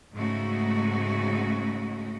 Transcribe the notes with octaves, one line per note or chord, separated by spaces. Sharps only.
G#2 C#3 G#3 A3 D#4 F#4